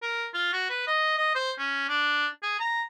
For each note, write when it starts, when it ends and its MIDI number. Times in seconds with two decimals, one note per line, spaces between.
0.02 0.26 70
0.34 0.48 65
0.53 0.70 66
0.70 0.84 71
0.87 1.16 75
1.18 1.32 75
1.35 1.52 72
1.58 1.86 61
1.88 2.26 62
2.43 2.55 68
2.60 2.82 82